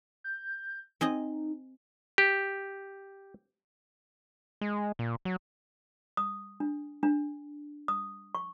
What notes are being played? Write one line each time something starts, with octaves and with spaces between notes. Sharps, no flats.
G6
C4 D#4 G#4 D#5
G4
G#3
A#2
F#3
D#6
D4
D4
D#6
C#6